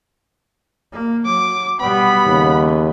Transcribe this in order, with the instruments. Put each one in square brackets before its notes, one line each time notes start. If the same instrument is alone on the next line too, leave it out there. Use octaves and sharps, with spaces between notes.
[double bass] A#3
[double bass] F#3 [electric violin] D6
[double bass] B2 G3 [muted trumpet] B3 [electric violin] B5
[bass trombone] D#2 [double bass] C#3